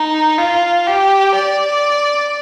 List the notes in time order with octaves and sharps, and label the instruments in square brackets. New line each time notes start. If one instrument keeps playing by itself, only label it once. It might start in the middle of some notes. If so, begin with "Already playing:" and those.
Already playing: [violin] D#4
F4
G4
D5